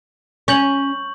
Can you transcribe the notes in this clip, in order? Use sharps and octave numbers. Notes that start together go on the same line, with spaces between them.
C#4 C#6 G6 F#7